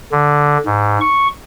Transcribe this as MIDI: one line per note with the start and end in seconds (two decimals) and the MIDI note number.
0.12 0.58 50
0.66 0.99 44
1.01 1.28 85